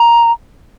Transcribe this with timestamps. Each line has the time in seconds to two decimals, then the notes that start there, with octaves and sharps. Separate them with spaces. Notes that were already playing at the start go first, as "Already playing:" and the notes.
Already playing: A#5